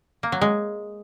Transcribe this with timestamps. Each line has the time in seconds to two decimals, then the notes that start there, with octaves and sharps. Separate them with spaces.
0.23 A#3
0.32 F#3
0.41 G#3